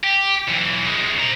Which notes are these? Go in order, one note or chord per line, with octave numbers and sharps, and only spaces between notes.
G4
B1 E3
F#2 G#3
C5 A#5